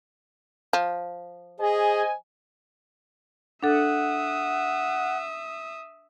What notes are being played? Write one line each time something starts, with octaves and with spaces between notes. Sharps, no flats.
F3
G#4 C5 D#5 G#5
D4 A4 E5 F#5 D#6